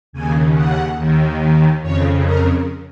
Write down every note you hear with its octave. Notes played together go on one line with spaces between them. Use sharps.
D#2 C#3 G#5
F#5
D#2 D#3
F2 C#3 C#5
A#4